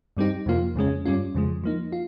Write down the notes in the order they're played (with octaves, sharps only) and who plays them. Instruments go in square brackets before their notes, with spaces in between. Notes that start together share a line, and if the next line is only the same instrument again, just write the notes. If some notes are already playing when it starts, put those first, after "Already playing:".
[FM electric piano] G2 G3 C4 D#4 G4
F2 C3 F3 A#3 F4
F2 C#3 G#3 C#4
G2 G3 C#4 F4
F2 C#3 F3 G#3
F3 A#3 D#4
F4